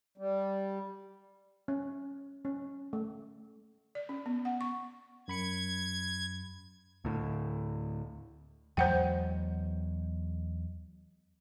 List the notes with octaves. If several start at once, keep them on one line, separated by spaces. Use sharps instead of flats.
G3
C#4
C#4
A3
D5
C#4
B3
F#5
C#6
F#2 B5 G#6 C#7
D2 A2
E2 F#3 G#3 C5 F#5 G5